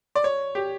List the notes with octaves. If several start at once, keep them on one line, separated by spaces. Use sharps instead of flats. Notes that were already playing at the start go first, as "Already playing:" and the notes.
D5
C#5
G4